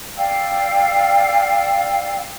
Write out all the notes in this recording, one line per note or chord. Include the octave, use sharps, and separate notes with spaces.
D5 F5 G5 E6